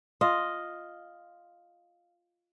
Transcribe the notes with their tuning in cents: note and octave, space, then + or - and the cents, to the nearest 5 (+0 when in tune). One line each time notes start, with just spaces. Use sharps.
F4 +0 D#5 +0